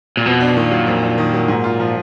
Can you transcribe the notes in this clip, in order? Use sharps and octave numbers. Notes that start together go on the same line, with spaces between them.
A#2
F2 B2
D4
A#2 D#3
F#3
F2
D4
D#3
F#3
G#2
F4
F3